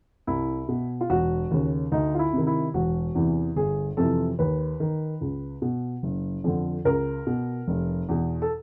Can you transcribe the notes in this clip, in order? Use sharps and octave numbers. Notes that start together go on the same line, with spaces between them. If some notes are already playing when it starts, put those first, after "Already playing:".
C2 E4
B2
F4
E1 F#4
D#2 C#3
D2 D#4
F4
E4
C3 D#3
E4
E1 F#4
E2 C3 E3
G1 G#4
F2 C3 E3 A4
D#2 B4
D#3
C#2
B2
F#1
F2 D3
C#2 A#4
B2
F1
E2 B2
A4